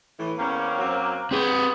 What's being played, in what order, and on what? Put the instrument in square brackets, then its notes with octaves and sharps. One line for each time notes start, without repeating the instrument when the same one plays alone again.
[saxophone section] A2 E3
[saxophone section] E2 C4 C#4 [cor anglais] A#3
[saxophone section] F#2 F#3 C4
[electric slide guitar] C4 B4 [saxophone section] G4 G#4